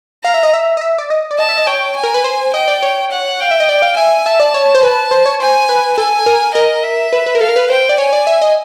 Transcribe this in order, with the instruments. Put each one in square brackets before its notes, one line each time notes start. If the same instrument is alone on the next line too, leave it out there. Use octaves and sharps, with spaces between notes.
[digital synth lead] F5 [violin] A#5
[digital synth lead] E5
D#5
E5
D#5
E5
D5
D#5
D5
[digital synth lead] D#5 [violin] A5
[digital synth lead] E5
D#5
[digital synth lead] C#5 [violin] G5
[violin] G#5
[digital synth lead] A#4
B4
C5
[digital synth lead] D#5 [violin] G5
[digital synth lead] D5
C#5
[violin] F#5
[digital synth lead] F5 [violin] G5
[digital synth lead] E5
D#5
D5
F5
[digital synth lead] E5 [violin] G#5
[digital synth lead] E5 [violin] A5
[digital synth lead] D5
C#5
C5
[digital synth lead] B4 [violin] A5
[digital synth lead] C5
C#5
[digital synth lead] C5 [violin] G#5
[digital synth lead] B4
[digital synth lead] A4 [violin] G#5
[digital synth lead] A#4
[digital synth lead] A#4 [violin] D#5
[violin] E5
[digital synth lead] B4
B4
A#4
[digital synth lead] A4 [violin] F5
[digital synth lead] A#4
B4
[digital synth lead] C5 [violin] G5
[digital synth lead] D5
[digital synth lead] C#5 [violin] G#5
[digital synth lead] D5
E5
D#5